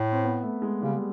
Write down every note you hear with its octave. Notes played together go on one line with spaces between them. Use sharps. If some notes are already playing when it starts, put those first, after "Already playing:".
Already playing: A2
C4
B3
A3
G#3
C#3 G3